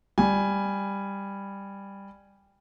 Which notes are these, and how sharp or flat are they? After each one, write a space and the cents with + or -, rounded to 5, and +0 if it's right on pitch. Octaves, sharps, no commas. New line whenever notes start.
G3 +10 G#5 +0